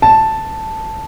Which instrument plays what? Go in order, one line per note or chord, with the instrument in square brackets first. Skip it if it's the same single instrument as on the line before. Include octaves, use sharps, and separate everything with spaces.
[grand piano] A5